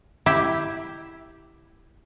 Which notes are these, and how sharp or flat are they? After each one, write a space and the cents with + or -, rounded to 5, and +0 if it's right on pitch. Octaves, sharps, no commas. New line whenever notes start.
E4 +0 G4 +0